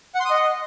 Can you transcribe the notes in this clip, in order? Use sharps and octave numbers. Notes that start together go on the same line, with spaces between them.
F#5
C6
D#6
D#5